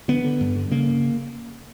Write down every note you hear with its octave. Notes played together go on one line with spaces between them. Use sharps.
D3 B3
D3
G2
D3
C#3 A#3